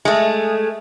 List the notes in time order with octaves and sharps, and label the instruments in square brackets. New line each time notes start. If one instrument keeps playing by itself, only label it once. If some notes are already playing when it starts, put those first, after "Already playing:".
[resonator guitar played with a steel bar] G#3 A3